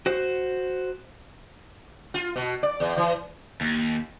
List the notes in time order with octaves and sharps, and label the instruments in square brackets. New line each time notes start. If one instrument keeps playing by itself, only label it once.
[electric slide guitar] F#4 C5
[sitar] F4
B2
D5
E2
E3
[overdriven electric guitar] D#2